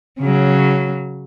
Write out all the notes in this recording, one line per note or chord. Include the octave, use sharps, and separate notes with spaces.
C#3 F#3